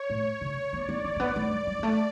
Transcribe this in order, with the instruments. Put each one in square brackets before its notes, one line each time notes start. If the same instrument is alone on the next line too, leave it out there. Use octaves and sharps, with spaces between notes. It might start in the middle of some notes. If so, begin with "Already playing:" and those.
Already playing: [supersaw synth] C#5
[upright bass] A2
C#3
[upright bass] B3 [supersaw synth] D5
[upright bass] B3
B3
A3
B3
A3
G3
G3
G3
A3